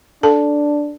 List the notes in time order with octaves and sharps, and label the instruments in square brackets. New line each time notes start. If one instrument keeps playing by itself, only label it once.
[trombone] D4 [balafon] A4 A5